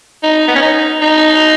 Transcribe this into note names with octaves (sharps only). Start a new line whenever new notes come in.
D#4
B3
C#4
D#4
D#4